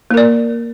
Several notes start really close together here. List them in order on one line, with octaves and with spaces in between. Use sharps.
A#3 A#4 D5